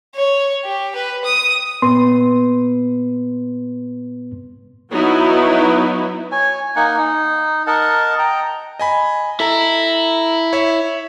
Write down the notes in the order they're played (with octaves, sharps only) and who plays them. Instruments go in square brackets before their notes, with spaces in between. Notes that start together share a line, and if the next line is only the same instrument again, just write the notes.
[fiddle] C#5
G4
B4
D#6
[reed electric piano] A#2 B3 B4 C6
[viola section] F#3 B3 D#4 E4 F#4
[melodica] C#5 G#5
A#3 D#4 F#5 G#5
D#4
A#4 D#5 F#5 A5
G5 A#5
[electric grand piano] D#5 G#5 B5
[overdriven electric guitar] E4 [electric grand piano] A4 A#5
[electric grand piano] C#5 E5